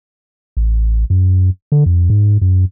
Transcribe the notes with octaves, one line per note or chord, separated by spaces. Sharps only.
A1
F#2
D3
F2
G#2
F#2